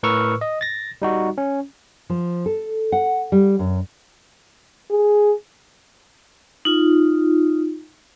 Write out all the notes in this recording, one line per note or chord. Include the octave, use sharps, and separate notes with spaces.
A2 A#4 B4 C#6 E6 F6
D#5
A6 A#6
G3 D#4 F#4
C#4
F3
A4
F#5
G3
F#2
G#4
D#4 F4